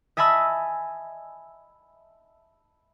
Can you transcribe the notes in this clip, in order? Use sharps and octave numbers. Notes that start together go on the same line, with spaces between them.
D#5 E5 G#5 A5 B5 E6